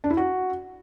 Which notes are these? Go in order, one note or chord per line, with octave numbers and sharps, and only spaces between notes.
D4
E4
F#4